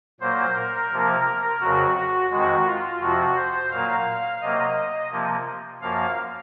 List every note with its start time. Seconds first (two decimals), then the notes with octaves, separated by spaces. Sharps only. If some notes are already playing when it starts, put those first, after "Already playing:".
0.20 A#2 F#3 A#3 C5
0.56 A#4
0.91 C3 F3 A#3
1.61 F2 C#3 F#3 F#4
1.96 F#4
2.31 F2 D#3 G#3 F#4
2.66 F4
3.01 F2 C3 F3 F#4
3.36 C5
3.71 A#2 F#3 A#3 F5
4.41 C3 F#3 A#3 D#5
5.11 C3 F3 A#3
5.81 F#2 F3 A#3 F5